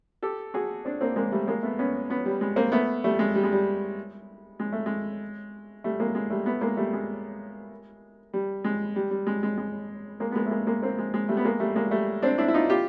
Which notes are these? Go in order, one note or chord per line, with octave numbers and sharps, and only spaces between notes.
G4 A4
F#4 G#4
C4 D4
A#3 C4
G#3 A#3
G3 A3
G#3 A#3
A3 B3
B3 C#4
B3 C#4
G3
G#3
A#3 C4
A3 B3
G3 A3
G#3
G3
G#3
G3
G#3
A3
G#3
G3 A3
G#3 A#3
G#3
G3 A3
A3 B3
G#3 A#3
G3 A3
G#3
G3
G#3
G3
G3
G#3
G#3
G#3
G#3 A#3
B3
G#3 A#3
A3
G#3 A#3
G#3 A#3
A#3 C4
G#3
G#3
G3 A3
B3
G#3 A#3
G3 A3
G#3 A#3
G3 A3
C4 D4
D4 E4
E4
D#4 F4
F4 G4